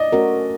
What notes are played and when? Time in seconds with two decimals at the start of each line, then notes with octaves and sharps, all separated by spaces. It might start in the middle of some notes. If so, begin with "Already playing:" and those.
Already playing: D5 D#5
0.12 A3 C#4 F#4 A#4